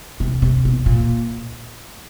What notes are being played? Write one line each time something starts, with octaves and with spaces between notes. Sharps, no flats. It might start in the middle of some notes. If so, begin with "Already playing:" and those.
C3
C3
B2
A#2